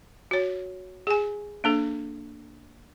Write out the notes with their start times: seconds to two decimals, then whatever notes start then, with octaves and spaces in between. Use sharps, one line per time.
0.31 F#4 C#5
1.07 G#4 G#5
1.64 A#3 D4 A4